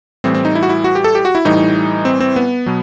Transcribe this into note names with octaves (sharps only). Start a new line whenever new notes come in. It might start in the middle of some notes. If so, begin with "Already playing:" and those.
A2 E3 G3 C4
C4
D#4
E4
F#4
E4
F#4
G4
A4
G4
F#4
E4
A2 E3 G3 D#4
C4
C4
B3
B2 F#3